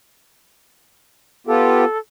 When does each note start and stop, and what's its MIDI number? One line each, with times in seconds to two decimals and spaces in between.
1.47 1.85 59
1.47 1.85 65
1.47 1.85 67
1.47 1.98 69